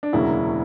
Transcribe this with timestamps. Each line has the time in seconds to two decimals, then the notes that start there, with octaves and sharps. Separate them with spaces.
0.03 D4
0.13 E1 D2 C#3 F#3 A#3 E4